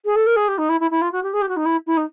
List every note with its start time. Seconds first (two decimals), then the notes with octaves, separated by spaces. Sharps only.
0.05 G#4
0.16 A4
0.27 A#4
0.36 G#4
0.48 G4
0.58 D#4
0.69 E4
0.80 E4
0.91 E4
1.02 F4
1.12 F#4
1.23 G4
1.33 G#4
1.42 G4
1.49 F#4
1.57 D#4
1.65 E4
1.87 E4
1.97 D#4